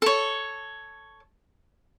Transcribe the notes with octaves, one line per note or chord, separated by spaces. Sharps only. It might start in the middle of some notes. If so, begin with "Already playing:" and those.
A4 C#5